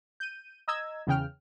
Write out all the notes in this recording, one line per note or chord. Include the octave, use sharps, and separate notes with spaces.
G6 D#7
D#5 A#5 E6 G#6
E2 C#3 G5 F6